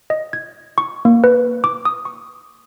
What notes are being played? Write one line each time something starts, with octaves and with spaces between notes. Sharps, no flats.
D#5
G#6
C#6
A#3
B4
D6
D#6
C#6